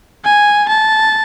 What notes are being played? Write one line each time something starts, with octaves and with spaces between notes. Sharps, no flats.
G#5
A5